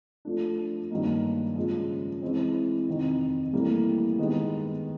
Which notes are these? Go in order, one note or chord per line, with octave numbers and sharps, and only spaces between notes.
F3 A3 D4
G2 D#3 F#3 A#3 D#4
C#3 F3 G#3
E3 G#3 C4
F2 C3 D#3
A2 E3 G3 A#3
D#3 G#3 B3